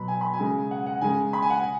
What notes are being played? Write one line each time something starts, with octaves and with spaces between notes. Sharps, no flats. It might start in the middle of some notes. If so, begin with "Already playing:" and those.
Already playing: B2 F#3 B5
G#5
B5
G#5
C#3 G#3
F#5
F#5
C#3 G#3 G#5
B5
G#5
F#5
G#5